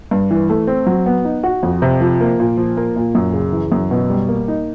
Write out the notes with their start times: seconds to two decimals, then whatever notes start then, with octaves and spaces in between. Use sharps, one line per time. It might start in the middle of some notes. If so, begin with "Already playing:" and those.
0.11 G2
0.31 E3
0.50 A3
0.67 C4
0.87 F#3
1.06 B3
1.25 D#4
1.43 F#4
1.63 F2
1.82 C3
2.01 F3
2.21 A#3
2.40 A#2
2.57 F3
2.77 A#3
2.96 A#2
3.15 F#2
3.33 C#3
3.52 E3
3.72 F#2
3.91 B2
4.10 G3
4.28 A#3
4.48 D#4